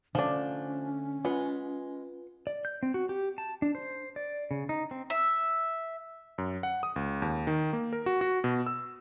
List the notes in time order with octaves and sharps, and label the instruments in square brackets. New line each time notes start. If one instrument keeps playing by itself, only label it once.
[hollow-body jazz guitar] D3 A3 [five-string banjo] F3 D4 [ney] C#4
[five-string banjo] G#3 [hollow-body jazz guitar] F4 B4 F#5
[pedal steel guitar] D5
G6
C4
F#4
G4
A5
D4
C5
D5
C#3
D#4
C4
[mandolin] E5
[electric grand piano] F#2
F#5
D#6
C#2
D#2
D#3
A#3
A#4
F#4
F#4
B2
E6